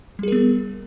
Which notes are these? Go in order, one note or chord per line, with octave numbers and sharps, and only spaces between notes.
G3 B3 G#4 A#4